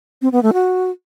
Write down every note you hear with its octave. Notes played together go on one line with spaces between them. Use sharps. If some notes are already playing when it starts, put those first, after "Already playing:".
C4
B3
A3
F#4